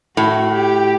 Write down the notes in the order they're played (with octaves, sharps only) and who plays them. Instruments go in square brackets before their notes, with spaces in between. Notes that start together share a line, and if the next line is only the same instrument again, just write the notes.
[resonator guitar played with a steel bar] A2 [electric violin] F#4
[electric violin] G4